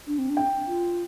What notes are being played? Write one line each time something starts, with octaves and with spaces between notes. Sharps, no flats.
D4
C4
D4
G5
F4